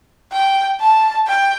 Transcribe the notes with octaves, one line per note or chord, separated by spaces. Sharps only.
G5
A5
G5